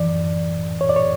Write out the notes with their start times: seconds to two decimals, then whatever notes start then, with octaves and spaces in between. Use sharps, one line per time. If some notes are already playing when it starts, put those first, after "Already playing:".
Already playing: F#2 E3 D5
0.81 C#5
0.89 D5
0.96 C#5